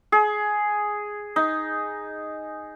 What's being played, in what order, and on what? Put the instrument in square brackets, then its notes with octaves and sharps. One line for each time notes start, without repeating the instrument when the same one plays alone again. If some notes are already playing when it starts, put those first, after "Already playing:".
[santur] G#4
D#4